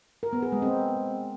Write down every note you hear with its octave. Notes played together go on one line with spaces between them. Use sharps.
A#4
B3
G#4
G#3
C4